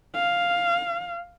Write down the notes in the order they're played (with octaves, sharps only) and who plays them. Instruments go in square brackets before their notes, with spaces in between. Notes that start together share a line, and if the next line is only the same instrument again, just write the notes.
[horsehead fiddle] F5